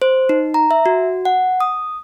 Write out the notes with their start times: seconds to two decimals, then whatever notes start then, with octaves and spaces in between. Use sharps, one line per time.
0.02 C5
0.29 D#4
0.54 A#5
0.71 E5
0.86 F#4
1.25 F#5
1.61 D#6